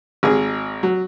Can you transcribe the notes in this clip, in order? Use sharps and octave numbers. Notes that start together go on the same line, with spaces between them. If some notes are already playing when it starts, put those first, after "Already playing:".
G#1 G#4
F#3